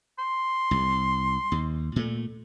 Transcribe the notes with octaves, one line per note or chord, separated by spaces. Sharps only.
C6
C2
D#2
A#2 A3